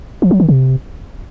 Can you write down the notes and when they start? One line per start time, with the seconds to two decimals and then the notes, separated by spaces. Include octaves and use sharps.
0.22 F3
0.31 F#3
0.40 D#3
0.49 C3